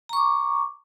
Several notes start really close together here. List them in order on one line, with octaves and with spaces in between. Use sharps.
A#5 C#6 D6